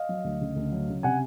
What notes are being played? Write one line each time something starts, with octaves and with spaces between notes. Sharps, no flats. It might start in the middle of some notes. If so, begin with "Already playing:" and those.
Already playing: D#5 F5
F#3
D2
C#3
D2
F#3
C#3
C3 F#5 G#5